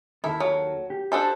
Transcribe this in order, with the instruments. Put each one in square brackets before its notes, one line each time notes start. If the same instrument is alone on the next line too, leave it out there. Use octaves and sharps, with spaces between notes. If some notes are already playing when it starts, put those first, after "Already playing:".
[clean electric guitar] D#2 D#3 A4 [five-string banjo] E4
[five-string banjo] F#3
[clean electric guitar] G4
[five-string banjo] D4 A4 C5